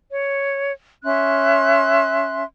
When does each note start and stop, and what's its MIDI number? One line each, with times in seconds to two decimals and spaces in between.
0.09 0.71 73
1.04 2.43 61
1.04 2.43 76
1.04 2.43 84
1.04 2.43 90